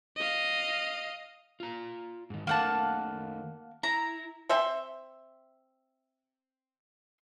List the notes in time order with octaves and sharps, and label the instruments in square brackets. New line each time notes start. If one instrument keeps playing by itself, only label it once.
[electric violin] D#5 F5
[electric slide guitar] F4 A#5
G#2 D#3
[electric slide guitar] D#3 A3 [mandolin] A#3 F#5 A5
[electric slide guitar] E4 [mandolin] A#5
[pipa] C4 E5 C6